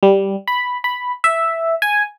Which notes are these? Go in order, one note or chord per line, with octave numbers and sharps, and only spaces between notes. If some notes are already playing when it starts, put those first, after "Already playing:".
G3
B5
B5
E5
G#5